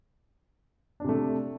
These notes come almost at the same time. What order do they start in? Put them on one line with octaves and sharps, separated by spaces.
D4 C3 A3